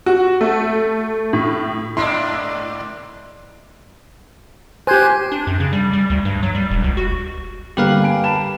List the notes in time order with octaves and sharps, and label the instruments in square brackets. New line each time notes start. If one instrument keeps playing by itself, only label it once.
[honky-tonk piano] F#4
A3
A2
[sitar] G#2 A#3 D4 [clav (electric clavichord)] E4 D#5 [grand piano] C6
[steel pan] G4 C5 [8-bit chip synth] G#5 F#6 G#6
[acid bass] D4
F#2
C#3
G3
G3
D2
G2
F#3
G3
E1
C#2
F#4
[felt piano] G2 D3 A#3 [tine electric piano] G4 B4 F5
[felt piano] G#5 D7
A5 B5 E7